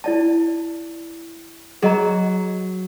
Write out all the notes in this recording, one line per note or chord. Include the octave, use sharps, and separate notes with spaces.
E4 D5 A5
F#3 G#4 D#5 A#5